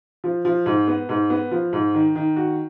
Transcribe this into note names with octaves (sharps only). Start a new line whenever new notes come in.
F3
F3
G#2
B3
G#2
B3
F3
G#2
D#3
D#3
F#4